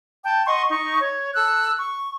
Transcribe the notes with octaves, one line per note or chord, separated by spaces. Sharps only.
G5 A5
D#5 F#5 C6 C#6
D#4 C#6
C#5
A4 E6 F#6
C#6